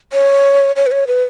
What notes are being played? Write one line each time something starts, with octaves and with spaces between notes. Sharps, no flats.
C#5
C#5
B4
C#5
B4